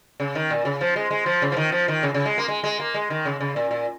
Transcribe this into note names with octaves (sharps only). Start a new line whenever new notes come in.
C#3
D#3
A#2
C#3
F3
G#3
G#3
F3
C#3
F3
D#3
F3
D#3
C#3
C#3
G#3
A#3
G#3
G#3
A#3
G#3
D#3
C#3
C#3
A#2
A#2